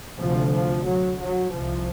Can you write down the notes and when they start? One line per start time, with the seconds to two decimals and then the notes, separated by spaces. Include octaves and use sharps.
0.19 D2 C3 F3
0.52 F3
0.86 F#3
1.19 F#3
1.53 C2 C3 F3